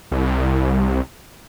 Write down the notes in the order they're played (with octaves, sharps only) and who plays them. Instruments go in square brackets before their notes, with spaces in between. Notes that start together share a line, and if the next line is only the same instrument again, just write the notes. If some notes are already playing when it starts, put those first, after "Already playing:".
[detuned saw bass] C2